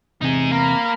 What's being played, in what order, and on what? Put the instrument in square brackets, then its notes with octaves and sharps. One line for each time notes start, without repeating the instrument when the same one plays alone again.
[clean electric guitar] E2 C3 [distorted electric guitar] D#4 G#4
[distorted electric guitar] A#3 [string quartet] A#5 B5 F6